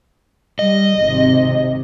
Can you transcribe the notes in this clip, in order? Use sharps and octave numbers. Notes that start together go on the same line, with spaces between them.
G3 D#5
G#1 C3